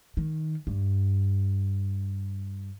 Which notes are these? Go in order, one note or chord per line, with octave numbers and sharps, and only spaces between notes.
D#3
G2